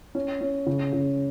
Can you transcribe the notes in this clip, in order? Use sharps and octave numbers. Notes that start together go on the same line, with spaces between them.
C#4
C#4
C#3
C#3